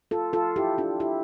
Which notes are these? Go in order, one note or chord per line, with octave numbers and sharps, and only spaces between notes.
F4 A4
F4 A4
E4 G4
D4 F4
E4 G4